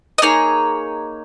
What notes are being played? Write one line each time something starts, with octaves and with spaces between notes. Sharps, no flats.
D#5
A#3 D#4 G#4 C#5